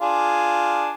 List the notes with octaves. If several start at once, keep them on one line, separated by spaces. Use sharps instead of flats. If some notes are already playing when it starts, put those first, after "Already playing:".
D4 F4 G#4